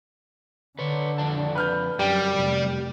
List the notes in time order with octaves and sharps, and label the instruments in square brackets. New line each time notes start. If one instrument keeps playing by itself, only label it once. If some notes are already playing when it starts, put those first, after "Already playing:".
[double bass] D3 [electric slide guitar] B4 C#5
[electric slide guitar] F2 D5 A5
[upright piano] B4 F6 G6
[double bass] F#2 [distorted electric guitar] G3 [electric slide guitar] G4 [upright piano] G5
[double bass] F1